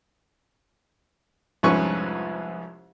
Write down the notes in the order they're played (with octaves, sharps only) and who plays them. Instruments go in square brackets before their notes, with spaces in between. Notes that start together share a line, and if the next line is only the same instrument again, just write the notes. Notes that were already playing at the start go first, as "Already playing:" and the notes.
[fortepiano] C2 F2 G#2 C#4 B4 C#6